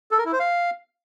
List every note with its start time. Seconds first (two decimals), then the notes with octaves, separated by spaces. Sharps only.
0.11 A4
0.18 A#4
0.25 E4
0.32 C5
0.40 F5